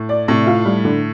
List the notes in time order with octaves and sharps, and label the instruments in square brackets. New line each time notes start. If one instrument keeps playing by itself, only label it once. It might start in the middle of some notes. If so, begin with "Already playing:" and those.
Already playing: [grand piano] A2
[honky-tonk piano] D5
[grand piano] A2 [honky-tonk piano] C3
[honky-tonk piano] F4
G3
D3